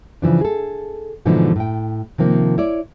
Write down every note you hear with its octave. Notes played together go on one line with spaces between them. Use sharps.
C#3 E3 F3 D4
G#4 A4
G#2 B2 D3 E3 F3 D#4
A2 G5
C3 D#3 F3 A#3
E4 C#5 D5